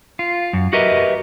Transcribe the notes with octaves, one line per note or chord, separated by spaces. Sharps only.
F4
F#2
F#4 G4 A#4 B4 D#5 E5